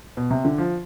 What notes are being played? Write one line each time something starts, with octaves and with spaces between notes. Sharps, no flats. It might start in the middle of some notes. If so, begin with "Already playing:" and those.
B2
C3
D3
F3